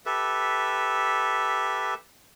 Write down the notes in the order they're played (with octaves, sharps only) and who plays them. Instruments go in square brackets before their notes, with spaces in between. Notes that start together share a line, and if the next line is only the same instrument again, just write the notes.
[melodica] G4 A4 B4 E5